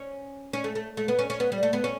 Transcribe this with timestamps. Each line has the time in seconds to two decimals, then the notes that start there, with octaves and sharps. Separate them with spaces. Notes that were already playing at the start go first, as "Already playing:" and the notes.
Already playing: C#4
0.53 C#4
0.64 A3
0.75 A3
0.97 A3
1.08 B3
1.19 C#4
1.30 C#4
1.40 B3
1.52 G3
1.63 A3
1.73 B3
1.84 C#4